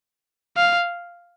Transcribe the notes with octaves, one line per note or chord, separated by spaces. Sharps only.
F5